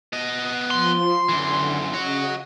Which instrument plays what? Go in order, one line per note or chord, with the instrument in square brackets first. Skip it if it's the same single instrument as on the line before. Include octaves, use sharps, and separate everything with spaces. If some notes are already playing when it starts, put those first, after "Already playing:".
[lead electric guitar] B3 D#5
[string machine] F3 [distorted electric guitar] C6
[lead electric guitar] F#2 E3 [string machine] D3
[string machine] C#3 D#5 [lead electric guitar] F#4 C#5